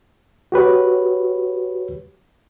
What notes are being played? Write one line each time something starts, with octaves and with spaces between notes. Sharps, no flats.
F#4 G4 B4 C#5